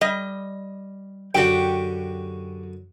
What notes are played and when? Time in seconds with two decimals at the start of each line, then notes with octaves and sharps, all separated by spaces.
0.01 G3 D#5
1.35 F#2 D3 F#4 G4 G5